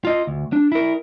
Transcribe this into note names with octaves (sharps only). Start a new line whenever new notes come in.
F4 D#5
D2
D4
E4 A#4